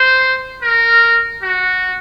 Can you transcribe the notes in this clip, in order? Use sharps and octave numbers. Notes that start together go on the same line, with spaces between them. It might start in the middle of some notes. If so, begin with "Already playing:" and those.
Already playing: C5
A#4
F#4